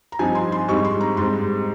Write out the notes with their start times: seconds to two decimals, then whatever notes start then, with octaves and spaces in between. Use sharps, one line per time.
0.12 A#5
0.19 G2 F3 C4 D#4 G#5
0.35 C6
0.52 C6
0.68 G#2 G3 C4 D#4 C#6
0.85 C6
1.01 A#5
1.17 G#2 G3 C4 C6